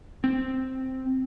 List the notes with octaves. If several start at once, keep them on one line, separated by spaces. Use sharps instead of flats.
C4